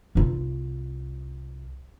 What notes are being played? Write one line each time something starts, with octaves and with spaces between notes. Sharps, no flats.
C2 F4